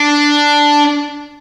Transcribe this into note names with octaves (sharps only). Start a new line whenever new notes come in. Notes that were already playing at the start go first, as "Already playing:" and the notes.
Already playing: D4